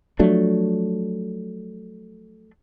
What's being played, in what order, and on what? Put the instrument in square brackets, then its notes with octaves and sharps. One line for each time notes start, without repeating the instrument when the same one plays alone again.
[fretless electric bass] F3 F#3 A3 D4